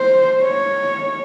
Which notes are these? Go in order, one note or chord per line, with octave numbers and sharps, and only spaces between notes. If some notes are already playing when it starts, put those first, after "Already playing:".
Already playing: C5
C#5